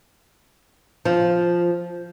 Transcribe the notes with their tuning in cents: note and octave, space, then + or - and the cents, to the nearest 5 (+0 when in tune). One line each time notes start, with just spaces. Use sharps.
F3 -5